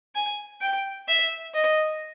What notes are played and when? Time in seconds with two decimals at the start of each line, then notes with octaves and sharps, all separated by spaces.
0.15 G#5
0.62 G5
1.08 E5
1.54 D#5